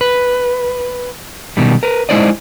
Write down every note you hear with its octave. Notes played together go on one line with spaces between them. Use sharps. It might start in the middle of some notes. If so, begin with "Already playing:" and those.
B4
B2 D#3 G3
A#4 B4
G#3 D#4 E4 C5 D5 D#5